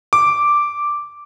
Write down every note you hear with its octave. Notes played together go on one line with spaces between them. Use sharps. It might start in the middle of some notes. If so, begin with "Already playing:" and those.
D6